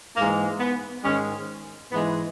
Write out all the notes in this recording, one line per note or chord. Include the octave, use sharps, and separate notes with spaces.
G#2 E3 G#3 A#3
B3
G#2 D#3 G#3 C#4
G#2 E3 G#3 B3